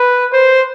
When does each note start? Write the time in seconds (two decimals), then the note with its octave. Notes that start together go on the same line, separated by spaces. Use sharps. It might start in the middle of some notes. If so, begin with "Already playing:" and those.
Already playing: B4
0.33 C5